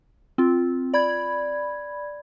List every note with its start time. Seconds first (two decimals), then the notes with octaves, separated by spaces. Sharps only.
0.38 C4 F4
0.94 D5 B5 G#6